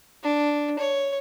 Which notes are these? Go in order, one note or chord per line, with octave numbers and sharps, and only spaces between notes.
D4
C#5